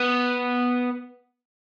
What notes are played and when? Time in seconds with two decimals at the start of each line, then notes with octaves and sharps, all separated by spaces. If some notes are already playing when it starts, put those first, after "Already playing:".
Already playing: B3